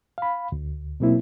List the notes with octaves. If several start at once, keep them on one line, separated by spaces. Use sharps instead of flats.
F5 B5
D2
B2 F#3 A#3 C4 E4